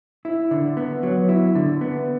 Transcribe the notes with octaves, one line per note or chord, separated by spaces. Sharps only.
E4
D3
B3
F#3
E4
D3
B3